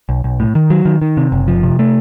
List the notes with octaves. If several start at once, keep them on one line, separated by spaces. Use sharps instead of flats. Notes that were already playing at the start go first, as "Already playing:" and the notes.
B1
B1
A2
D#3
F#3
D#3
D#3
C3
F#1
F3
C3
A3